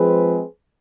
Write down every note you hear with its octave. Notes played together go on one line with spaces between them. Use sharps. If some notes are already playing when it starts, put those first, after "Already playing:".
Already playing: F3 G#3 C4 G#4 B4